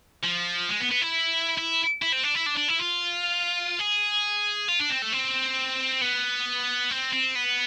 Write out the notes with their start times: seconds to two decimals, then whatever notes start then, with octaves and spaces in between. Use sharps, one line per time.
0.24 F3
0.69 G#3
0.80 B3
0.91 B3
1.02 E4
1.58 E4
2.02 E4
2.13 C4
2.24 D4
2.35 E4
2.46 D4
2.57 D4
2.69 E4
2.79 F4
3.79 G#4
4.69 F4
4.80 D4
4.90 C4
5.02 A3
5.12 C4
6.01 B3
6.91 C4
7.13 C4
7.35 B3